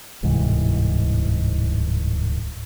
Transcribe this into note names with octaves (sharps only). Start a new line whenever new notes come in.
D1 C2 G#2 E3